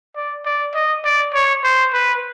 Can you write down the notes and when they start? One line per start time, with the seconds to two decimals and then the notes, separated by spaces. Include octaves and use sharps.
0.16 D5
0.45 D5
0.75 D#5
1.05 D5
1.34 C#5
1.64 C5
1.93 B4